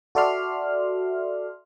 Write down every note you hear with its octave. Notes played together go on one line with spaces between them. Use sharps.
F#4 A4 D5 E5 C6 F6